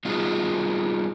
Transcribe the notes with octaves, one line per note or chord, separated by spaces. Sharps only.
G3 B3 D#4 F4 F#4 G#4